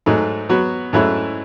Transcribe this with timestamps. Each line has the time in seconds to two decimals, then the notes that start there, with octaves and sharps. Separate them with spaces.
0.06 G#2 F#3 A3 D#4
0.49 F#3 B3 F#4
0.93 G#2 F#3 A3 C#4 E4